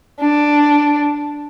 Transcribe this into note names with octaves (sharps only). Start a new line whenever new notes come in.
D4